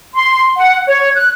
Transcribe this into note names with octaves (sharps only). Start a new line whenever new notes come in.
C6
F#5
C#5
F#6